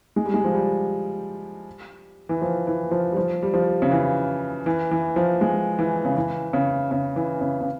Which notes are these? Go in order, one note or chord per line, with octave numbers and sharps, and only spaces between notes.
G#3
G3
G#3
F3
G3
E3
F3
E3
F3
G3
F3
G3
F3
C#3
E3
E3
E3
F3
G#3
E3
C#3
E3
C#3
C#3
E3
C#3
C#3